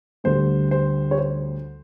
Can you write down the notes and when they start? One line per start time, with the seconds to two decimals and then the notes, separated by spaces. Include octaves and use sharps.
0.24 D2 D3 G3 C5
0.71 C5
1.11 C#5
1.18 C5